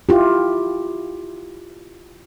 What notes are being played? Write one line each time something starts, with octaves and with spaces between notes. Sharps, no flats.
E4 F4 G4